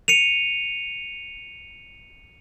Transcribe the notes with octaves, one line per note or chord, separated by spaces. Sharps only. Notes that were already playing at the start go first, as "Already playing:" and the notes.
C#7 D#7 F7